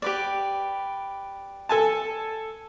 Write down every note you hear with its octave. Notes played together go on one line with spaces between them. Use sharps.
G4 B4 D5
A4 G#5 A5